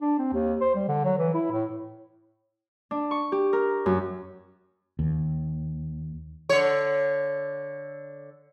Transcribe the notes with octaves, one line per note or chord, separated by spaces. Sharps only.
D4
C4
D#2
C5
G3
D3
F#3
E3
E4
A2
D4
C#6
G4
A#4
F#2
D#2
D3 C#5